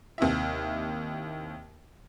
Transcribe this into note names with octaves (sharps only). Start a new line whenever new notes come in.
D#2 C3 E4 E5